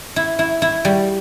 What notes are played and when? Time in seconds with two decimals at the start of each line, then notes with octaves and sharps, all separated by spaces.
0.16 E4
0.39 E4
0.62 E4
0.85 G3